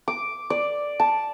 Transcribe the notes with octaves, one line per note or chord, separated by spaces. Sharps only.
D6
D5
A5